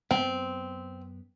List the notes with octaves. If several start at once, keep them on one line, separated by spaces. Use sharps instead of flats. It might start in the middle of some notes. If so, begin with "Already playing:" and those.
F#2 B3 C4